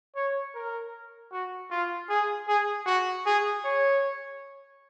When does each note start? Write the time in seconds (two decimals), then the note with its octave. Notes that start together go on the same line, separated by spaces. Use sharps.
0.16 C#5
0.54 A#4
1.32 F#4
1.71 F4
2.09 G#4
2.48 G#4
2.86 F#4
3.26 G#4
3.64 C#5